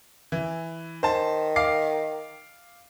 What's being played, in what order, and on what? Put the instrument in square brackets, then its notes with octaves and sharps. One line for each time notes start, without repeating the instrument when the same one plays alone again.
[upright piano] E3
[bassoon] D#3 [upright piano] C5 A5
[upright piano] F5 D6 C7